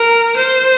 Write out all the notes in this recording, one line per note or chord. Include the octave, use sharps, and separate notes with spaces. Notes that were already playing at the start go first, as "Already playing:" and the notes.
Already playing: A#4
C5